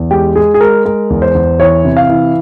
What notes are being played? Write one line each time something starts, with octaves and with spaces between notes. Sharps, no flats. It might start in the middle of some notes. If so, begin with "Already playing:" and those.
Already playing: E2
G#3 G4
G#3 G#4
G#4
G#3 A#4
G#3 A#4
E2
C5
E2
E3 C#5
C3
F5
E3